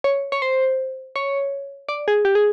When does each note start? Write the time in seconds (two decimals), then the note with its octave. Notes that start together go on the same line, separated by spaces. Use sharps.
0.04 C#5
0.32 C#5
0.42 C5
1.16 C#5
1.89 D5
2.08 G#4
2.25 G4
2.35 G#4